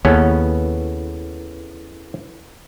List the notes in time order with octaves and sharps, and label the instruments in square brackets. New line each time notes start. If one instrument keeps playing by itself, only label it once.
[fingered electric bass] D#2 [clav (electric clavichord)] C#3 B3 C#4 [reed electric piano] E4 A4 B4